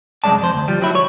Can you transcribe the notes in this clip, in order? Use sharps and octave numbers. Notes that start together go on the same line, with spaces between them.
C2 F#2 G#3 D5 A5
F2 C5
D2
F3 G3
F#3 E4
C#5